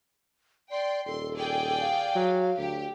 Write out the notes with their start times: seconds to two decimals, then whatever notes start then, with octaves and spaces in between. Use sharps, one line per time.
0.71 D5 G5 C6
1.07 D#1 A4 C6
1.35 G#4 D5 G5
1.81 F5
2.15 F#3
2.58 D2 G4